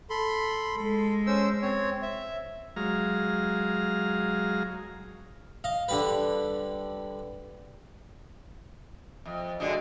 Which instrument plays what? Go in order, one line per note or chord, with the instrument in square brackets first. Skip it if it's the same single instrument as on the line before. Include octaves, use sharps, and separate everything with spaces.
[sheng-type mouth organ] A4 B5 C6
[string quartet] G#3 [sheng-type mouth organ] A4
[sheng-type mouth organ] C#4 C5 E6
C4 C#5
E5
[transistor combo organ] F#3 G#3 F5 A#5
[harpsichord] D#5 F5
D3 G3 B4
[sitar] F2 [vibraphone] D#5 E5
[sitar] A2 D3 G#3 [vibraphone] F#4 D5 [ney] D#5